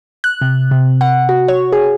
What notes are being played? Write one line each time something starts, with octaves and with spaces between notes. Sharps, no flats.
F#6
C3
C3
F#5
F#4
C#5
G#4